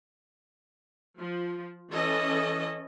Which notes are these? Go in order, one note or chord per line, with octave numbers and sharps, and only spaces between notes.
F3
E3 C#4 A4 D#5